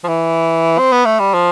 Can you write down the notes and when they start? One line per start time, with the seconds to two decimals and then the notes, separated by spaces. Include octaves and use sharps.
0.04 F3
0.08 E3
0.78 C4
0.92 B3
1.05 A3
1.20 G3
1.33 F3